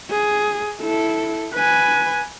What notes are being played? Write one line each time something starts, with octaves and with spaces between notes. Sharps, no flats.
G#4
E4 A4
B4 G#5